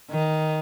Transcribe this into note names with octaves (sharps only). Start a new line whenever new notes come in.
D#3